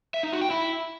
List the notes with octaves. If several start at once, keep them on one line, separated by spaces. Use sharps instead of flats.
E5
D#4
F#4
G5
E4